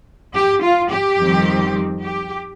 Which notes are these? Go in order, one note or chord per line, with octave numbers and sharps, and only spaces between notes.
G4
F4
G4
F2 D#3 G3 C4
G4